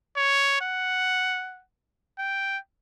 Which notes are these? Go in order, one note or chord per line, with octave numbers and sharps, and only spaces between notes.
C#5
F#5
G5